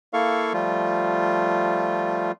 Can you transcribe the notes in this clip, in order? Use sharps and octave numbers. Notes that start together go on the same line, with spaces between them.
A#3 E4 A4 F5 C#6
F3 G3 A3 F4